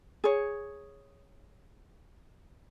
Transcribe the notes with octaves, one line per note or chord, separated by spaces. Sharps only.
G#4 C#5